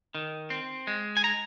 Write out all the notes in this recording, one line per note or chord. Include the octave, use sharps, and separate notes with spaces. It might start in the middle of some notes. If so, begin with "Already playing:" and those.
D#3
C4
G#3
G#5
A#5